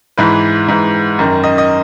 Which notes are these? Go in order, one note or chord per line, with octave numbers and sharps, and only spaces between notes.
G#2 E3 B4
G#2 E3
F#2 D#3
D#5
D#5